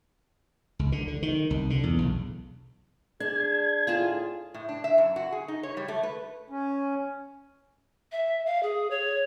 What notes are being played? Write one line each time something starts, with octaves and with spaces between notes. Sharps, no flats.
C#2
D3
D3
D#3
C2
D3
E2
B1
D4 G#4 G#6
A2 F4 G#4 A5
A2
D4
E5
F#2
F#4
G#4
D#4
C#5
G3
A3
B4
C#4
E5
F5
G#4
C#5